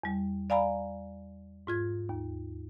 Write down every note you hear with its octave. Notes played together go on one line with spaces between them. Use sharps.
E2 G3
D5 F5 G#5 A#5 B5
G#2 F4 G#6
D#2